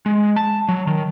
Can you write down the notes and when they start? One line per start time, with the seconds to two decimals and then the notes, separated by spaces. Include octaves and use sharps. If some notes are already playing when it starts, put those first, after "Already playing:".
0.06 G#3
0.36 A5
0.69 F#3
0.87 D#3